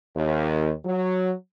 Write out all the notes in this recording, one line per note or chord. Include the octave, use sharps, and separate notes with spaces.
D#2
F#3